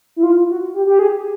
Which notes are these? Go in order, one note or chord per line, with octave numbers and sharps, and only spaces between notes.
E4
F4
F#4
G4
G4
G#4